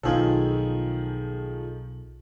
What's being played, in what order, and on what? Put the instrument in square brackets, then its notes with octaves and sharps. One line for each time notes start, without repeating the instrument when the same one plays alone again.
[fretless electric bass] B1 [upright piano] D#3 F3 [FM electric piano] F4 G#4 A4